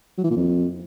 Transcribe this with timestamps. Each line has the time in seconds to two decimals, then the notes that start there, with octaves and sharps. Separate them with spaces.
0.18 F#3
0.24 E3
0.30 A#2
0.37 F2